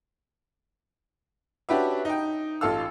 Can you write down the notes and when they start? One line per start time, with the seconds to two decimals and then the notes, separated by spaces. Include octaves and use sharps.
1.69 C#4 D4 F#4 G4 B4 E5
2.05 D#4 G5
2.61 A1 F4 A4 F5 E6